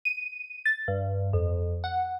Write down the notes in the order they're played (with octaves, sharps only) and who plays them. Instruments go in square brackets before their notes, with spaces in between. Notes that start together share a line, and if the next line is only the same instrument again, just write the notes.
[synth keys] D#7
A6
G2
F2
F#5